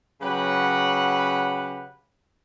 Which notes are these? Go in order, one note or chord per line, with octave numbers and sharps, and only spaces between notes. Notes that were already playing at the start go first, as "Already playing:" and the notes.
C#3 F#3 G4 B4 F#5